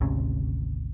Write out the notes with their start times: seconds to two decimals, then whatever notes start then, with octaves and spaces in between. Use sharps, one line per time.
0.01 G#1 D2 C3 C#4